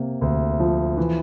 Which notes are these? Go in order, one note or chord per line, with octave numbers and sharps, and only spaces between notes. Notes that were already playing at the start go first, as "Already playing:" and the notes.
Already playing: C3 A#3
D2
F3
E3